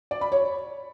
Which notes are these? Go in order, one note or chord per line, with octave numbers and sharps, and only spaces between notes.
D5
B5
C#5